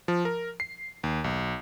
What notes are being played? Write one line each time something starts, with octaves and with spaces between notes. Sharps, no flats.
F3
A#4
C7
D#2
B1